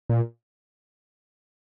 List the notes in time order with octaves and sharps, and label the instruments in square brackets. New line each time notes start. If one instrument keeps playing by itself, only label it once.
[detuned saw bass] A#2